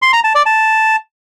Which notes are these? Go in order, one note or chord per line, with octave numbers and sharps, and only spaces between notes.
C6
A#5
A5
D5
A5